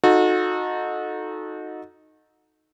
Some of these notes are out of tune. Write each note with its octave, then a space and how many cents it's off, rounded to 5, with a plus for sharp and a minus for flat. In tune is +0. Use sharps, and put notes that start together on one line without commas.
D#4 +0 F#4 -30 A4 -10